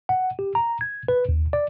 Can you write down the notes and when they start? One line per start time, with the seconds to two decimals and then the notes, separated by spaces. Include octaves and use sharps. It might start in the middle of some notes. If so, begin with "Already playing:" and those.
0.09 F#5
0.39 G4
0.55 A#5
0.81 G#6
1.08 B4
1.29 D#2
1.53 D5